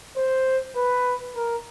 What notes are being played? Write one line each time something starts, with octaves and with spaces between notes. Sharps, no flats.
C5
B4
A#4